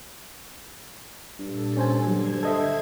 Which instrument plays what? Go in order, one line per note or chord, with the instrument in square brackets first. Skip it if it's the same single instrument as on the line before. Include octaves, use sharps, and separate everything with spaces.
[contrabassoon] G2 [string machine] A#2 A4
[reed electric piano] C#4 C5 G#5
[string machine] D3 C5 G#6 [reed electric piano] F#3
[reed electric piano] A4 D#5 E5